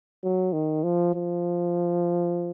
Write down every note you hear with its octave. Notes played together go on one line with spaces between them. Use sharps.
F#3
D#3
F3
F3